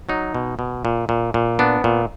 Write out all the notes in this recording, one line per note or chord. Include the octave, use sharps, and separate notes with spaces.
F#3 D#4
B2
B2
A#2
A#2
A#2
B3 D4
A#2